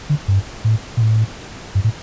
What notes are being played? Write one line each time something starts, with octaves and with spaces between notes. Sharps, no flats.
D3
G2
A2
A#2
A2
G2
A2